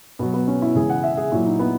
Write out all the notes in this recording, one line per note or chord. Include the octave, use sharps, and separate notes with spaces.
B2 F#3 B3
B3
C#4
E4
C#3 E3 G#3 G#4
F#5
E5
G#4
A#2 F#3 E4
D#4
B3